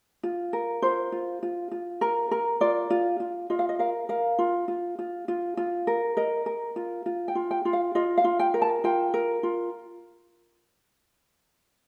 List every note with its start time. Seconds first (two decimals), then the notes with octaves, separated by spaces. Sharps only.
0.23 F4
0.53 A#4
0.82 F4 C5
1.12 F4
1.43 F4
1.72 F4
2.01 A#4
2.31 A#4
2.61 F4 D5
2.90 F4
3.20 F4
3.50 F4 D#5
3.59 F5
3.69 D#5
3.79 A#4 F5
4.09 A#4 F5
4.39 F4
4.68 F4
4.99 F4
5.28 F4
5.57 F4
5.87 A#4
6.17 A#4 D#5
6.46 A#4
6.76 F4
7.06 F4
7.28 G5
7.35 F4
7.51 G5
7.65 F4
7.73 F5
7.95 F4 D#5
8.17 F5
8.24 F4
8.39 G5
8.54 A#4
8.62 A5
8.84 F4 G5
9.14 A#4
9.43 F4